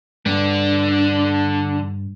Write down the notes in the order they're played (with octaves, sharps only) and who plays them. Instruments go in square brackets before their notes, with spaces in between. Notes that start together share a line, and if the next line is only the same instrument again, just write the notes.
[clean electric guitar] G2 [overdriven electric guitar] D3 D4